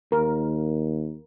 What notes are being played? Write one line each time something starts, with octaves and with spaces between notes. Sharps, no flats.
D#2 A#4